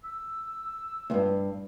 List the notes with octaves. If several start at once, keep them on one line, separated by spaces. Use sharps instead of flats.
E6
E2 G2